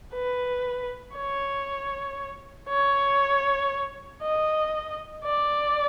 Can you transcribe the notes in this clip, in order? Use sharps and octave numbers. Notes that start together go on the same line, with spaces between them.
B4
C#5
C#5
D#5
D5